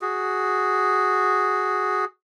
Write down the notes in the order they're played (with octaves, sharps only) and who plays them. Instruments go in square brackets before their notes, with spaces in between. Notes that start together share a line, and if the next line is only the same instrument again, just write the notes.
[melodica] F#4 G#4